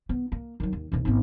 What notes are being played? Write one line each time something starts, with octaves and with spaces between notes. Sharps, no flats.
B3
A#3
D#3 F#3
D#2
D#1 D#2
G#1 B3